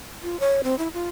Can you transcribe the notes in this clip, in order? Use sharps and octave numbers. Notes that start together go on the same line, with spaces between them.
F4
C#5
C4
E4
F4